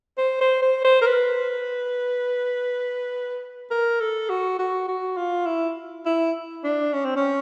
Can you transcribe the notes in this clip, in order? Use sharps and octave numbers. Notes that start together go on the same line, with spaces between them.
C5
C5
C5
C5
A#4
B4
A#4
A4
F#4
F#4
F#4
F4
E4
E4
D4
C#4
C4
C#4